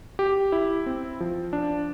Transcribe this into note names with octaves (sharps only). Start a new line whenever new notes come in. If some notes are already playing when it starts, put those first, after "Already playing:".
G4
E4
C4
F3
D4